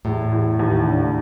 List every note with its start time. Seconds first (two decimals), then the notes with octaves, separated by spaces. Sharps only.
0.05 E2 A2
0.32 E2
0.59 D#2
0.86 D3